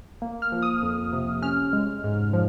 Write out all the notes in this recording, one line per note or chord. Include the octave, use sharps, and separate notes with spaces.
A#3
F6
F3
D#6
F2
C3
C#4 F6
G#3
G#2
F3